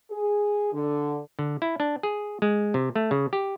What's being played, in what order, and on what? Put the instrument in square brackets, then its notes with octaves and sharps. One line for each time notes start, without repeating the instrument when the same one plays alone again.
[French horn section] G#4
D3
[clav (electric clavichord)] D3
E4
D4
G#4
G#3
C3
A3
C#3
G4